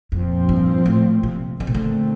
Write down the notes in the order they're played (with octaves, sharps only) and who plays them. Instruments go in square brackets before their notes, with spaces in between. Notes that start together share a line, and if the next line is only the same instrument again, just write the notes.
[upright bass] F2 [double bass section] A#2 F3 C4
[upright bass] G2
A2
C3
[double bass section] A#2 A3 C4 [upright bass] D3
[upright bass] C3
D3